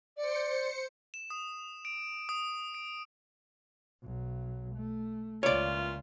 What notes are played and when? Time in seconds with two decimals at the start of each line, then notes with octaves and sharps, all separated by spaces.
0.17 C5 D5 C#7
1.14 E7
1.30 D#6
1.85 D7
2.29 D#6
2.74 D7
4.02 B1 F#3
4.74 A3
5.43 C#2 A#2 C#3 E3 F4 C#5 D5